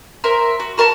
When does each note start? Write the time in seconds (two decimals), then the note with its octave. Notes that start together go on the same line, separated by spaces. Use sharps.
0.24 A#4 C5 E5
0.60 F#4
0.78 F#4 A#4 A5 A#5